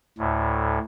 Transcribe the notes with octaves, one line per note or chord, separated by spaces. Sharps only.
D2 A2